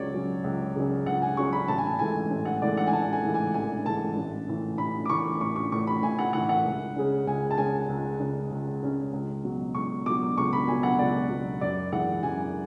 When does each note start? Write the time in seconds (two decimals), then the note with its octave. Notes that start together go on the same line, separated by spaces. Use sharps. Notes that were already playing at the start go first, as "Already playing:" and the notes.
Already playing: C#2 C#3 F#3 C#5 D5
0.13 C#3 F#3 C#4
0.44 C#2
0.75 C#3 F#3 C#4
1.06 C#2 F#5
1.22 G#5
1.37 C#3 F#3 C#4 C#6
1.53 B5
1.68 A1 A5
1.78 G#5
1.87 A5
1.99 G#2 E3 A3 G#5
2.30 A1
2.45 F#5
2.61 G#2 E3 A3 D5
2.77 F#5
2.87 G#5
2.92 A1 A5
3.13 G#5
3.23 G#2 E3 A3
3.34 G#5
3.54 A1 G#5
3.85 G#2 E3 A3 A5
4.17 A1
4.48 A2 E3
4.78 A1 B5
5.05 D6
5.09 A2 E3 C#6
5.41 A1 C#6
5.56 C#6
5.72 A2 E3 C#6
5.87 B5
6.03 A1 G#5
6.19 F#5
6.33 A2 E3 F#5
6.49 F#5
6.65 C#2
6.96 C#3 G#3 C#4
7.26 C#2 G#5
7.51 A5
7.58 C#3 G#3 C#4 G#5
7.89 C#2
8.20 C#3 G#3 C#4
8.51 C#2
8.82 C#3 G#3 C#4
9.13 C#2
9.44 B2 F#3
9.75 C#2 C#6
10.06 B2 F#3 D6
10.38 C#2 C#6
10.53 B5
10.67 B2 F#3 G#5
10.83 F#5
10.99 C#2 D5
11.30 B2 F#3
11.61 F#2 D5
11.92 E3 G#3 F#5
12.23 F#2 G#5